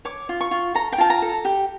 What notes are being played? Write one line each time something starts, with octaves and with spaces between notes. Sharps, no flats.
C#5 D6
F4
C#6
F4
A4 A#5
G5
F4 A5
A#5
A4
G4